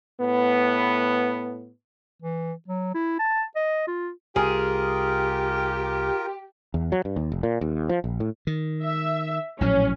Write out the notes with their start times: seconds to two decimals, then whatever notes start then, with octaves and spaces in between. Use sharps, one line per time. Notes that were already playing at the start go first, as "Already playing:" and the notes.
0.20 A2 B3
2.22 E3
2.68 F#3
2.94 E4
3.19 A5
3.56 D#5
3.87 F4
4.36 C2 F4 G4 G#4 A#4
6.74 E2
6.92 F#3
7.05 G2
7.16 D#2
7.32 F1
7.43 A#2
7.61 D#2
7.89 F3
8.04 A#1
8.20 A2
8.47 D#3
8.83 E5
9.61 A#1 A2 F#3 C#4